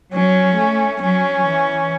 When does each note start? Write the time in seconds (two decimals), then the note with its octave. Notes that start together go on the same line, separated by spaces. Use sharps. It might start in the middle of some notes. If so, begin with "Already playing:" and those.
0.13 F#3 C#4
0.57 A3
1.01 F#3 C#4
1.45 E3